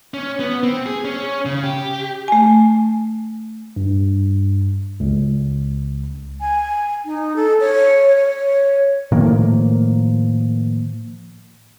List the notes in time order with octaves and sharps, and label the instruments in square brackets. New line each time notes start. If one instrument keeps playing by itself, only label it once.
[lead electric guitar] C#4
B3
C4
G#4
C#4
C#3
G4
[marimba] A3 G#5
[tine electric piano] G2
C#2
[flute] G#5
D#4
A4
C#5
C#5
[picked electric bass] A2 D#3 F3 A#3